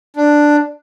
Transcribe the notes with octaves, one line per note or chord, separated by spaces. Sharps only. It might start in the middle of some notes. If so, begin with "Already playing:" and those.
D4